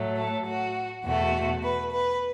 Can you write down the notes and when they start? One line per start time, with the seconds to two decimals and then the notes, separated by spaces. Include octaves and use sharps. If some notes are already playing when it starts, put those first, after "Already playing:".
Already playing: A2 F#3 A3
0.17 A4
0.46 F#4
1.05 E2 B2 A3 F#4
1.63 B4
1.92 B4